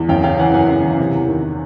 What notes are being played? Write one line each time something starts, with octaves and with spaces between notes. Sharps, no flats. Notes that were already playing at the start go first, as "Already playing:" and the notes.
Already playing: E2
F#2 F5 G5
C#3 F5 G5
E3 F#5 G#5
F#2 F#5 G#5
C#3
E3
C3
E2
D#3